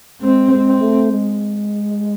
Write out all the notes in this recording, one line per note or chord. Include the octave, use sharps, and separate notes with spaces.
G#3 C4
G#3
C4
A3
G#3